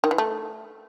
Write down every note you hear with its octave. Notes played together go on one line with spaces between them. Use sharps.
D#3
E3
A3